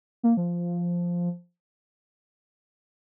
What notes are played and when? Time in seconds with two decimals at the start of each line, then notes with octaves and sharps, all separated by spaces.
0.23 A#3
0.37 F3